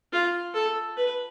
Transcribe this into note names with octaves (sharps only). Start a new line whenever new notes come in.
F4
A4
B4